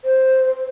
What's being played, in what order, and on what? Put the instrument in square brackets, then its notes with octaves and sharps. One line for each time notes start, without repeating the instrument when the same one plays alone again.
[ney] C5